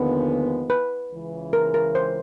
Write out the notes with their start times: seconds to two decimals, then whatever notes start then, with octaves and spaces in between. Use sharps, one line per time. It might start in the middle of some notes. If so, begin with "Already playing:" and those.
Already playing: D#2 D3 F3 G#3 B3
0.70 B4
1.11 C#2 C#3 E3
1.53 A#4
1.74 A#4
1.95 C5